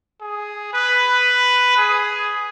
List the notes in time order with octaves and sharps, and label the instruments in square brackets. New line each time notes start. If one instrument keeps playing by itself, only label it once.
[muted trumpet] G#4
B4
G#4